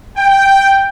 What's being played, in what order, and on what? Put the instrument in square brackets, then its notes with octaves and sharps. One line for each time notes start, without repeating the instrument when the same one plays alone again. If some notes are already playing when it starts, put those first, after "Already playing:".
[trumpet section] G5